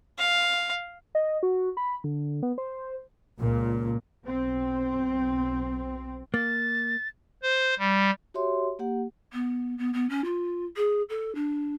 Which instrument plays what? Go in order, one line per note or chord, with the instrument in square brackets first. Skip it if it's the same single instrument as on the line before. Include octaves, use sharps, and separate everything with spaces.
[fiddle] F5
[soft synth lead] D#5
F#4
B5
D3
B3
C5
[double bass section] C#2 A#2
B1 C4
[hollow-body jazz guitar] A#3 [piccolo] A6
[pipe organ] C5
G3
[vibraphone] F#4 G4 C#5 E5 C6
A#3 G4 F#5
[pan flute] B3
B3
B3
C#4
F4
G#4
A4
D4